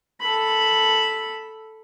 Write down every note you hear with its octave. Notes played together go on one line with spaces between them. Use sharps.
A4 B5